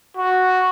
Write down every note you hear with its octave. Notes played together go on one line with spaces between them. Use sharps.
F#4